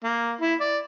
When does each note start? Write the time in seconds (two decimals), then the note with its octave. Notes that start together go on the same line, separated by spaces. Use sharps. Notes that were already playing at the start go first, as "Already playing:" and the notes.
0.04 A#3
0.41 E4
0.60 D5